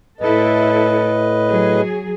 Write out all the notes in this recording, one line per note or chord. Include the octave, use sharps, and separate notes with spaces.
A2 E4 A4 B4 D#5
F#3 G#4